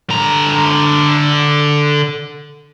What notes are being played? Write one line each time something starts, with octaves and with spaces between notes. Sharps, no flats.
D3 A#5